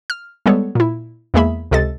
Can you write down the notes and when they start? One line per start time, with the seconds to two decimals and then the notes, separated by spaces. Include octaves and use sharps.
0.10 F6
0.46 G3 G#3 B3 A4 C#5
0.75 A#2 E4
1.34 E2 G#3 A#3 G#4 E5 B5
1.71 C#2 C3 A4 D#5 A6